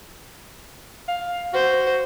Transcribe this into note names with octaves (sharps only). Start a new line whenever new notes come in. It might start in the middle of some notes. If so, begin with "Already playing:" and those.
F5
F#4 C5